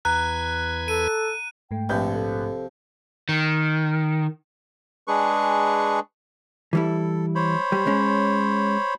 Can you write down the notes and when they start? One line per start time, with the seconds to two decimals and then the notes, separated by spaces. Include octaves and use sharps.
0.05 E2 B4 A#5 F#6 G#6
0.88 A4 D#7
1.71 G#2 A3 G5
1.89 A#1 C3 F3 B4 G6
2.14 A4
3.29 D#3
5.07 G#3 D4 G#4 B4 C#6
6.73 E3 G3 E4 A4
7.35 C5 C#5 B5
7.72 G3
7.87 G#3 C#4